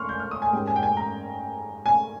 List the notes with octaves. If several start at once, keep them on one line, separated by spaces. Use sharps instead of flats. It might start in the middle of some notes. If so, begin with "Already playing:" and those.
Already playing: C6 C#6 F6
G6
F6
D#6
G#5
G#2 G3 A#3 C#4 G5
G#5
G5
G#5
A#5
G#5